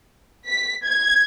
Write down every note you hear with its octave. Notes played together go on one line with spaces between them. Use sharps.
B6
G#6